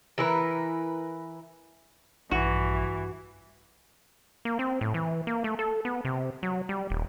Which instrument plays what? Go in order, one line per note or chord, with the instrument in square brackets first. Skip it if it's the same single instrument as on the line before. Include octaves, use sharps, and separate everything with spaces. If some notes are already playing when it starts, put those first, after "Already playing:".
[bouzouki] E3 E4 A#4 B4
[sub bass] A#1 [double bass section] G2 [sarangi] E3 [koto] F#4
[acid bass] A#3
C4
A2
E3
A#3
A3
A4
B3
C3
F#3
G3
D#1